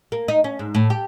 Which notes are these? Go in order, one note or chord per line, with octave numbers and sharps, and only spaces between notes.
A#3
D#4
C#4
G#2
A2
G4